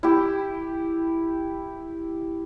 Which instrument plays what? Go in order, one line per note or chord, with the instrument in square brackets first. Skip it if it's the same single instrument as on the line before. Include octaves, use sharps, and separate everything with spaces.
[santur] E4 G4